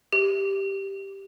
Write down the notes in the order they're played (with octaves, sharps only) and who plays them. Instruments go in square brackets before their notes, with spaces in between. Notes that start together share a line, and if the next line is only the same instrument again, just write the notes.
[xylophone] G4